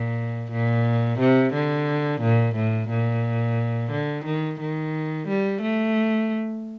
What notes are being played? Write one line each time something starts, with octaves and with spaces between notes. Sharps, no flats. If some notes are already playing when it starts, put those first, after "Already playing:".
Already playing: A#2
A#2
C3
D3
A#2
A2
A#2
D3
D#3
D#3
G3
A3